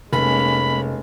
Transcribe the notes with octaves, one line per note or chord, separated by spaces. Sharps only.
F1 G#3 A#3 C#4 B5